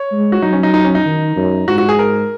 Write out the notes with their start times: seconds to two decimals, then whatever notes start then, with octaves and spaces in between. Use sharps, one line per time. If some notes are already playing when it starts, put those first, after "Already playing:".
Already playing: C#5
0.12 G#3
0.32 F#4
0.42 F#3 D#4
0.53 C#4
0.63 D#4
0.74 D#4
0.85 C#4
0.95 D#4
1.05 D#3
1.36 F#2
1.68 G#2 F#4
1.78 F#4
1.89 G#4
1.99 A#4